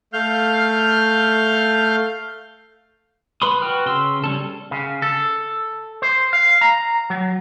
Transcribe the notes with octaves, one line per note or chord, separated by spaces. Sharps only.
A3 F5 F6 G6
B4 B5 C6 D#6
F#4 B4 G5 F6
C#3 C6 E6
G3 C#4 A4
C#3
A4
C5
F5
A#5
F#3